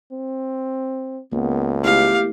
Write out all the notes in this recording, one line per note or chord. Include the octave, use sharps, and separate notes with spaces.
C4
C#2 A#3 B3
A3 B3 E4 G4 F5